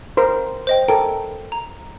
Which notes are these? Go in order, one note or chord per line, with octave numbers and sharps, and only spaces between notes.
A#4 C5
C5 D#5 G5
A4 A#4 G5
A#5